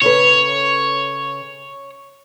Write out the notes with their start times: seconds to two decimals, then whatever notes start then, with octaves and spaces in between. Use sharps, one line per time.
0.02 C#3 A4 B4 C#5